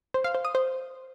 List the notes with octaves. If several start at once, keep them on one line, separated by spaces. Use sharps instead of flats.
C5
F5
C5
D#6
C5